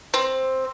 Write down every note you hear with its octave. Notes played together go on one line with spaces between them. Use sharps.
C4